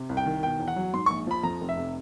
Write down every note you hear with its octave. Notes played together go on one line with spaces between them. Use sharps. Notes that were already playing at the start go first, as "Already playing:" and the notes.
Already playing: C3
C2
G5
D#3
B2 G5
E2
F#5
F#3
G#2 C6
A#1 C#6
F3 B5
F2 A#5
F1
E5
C3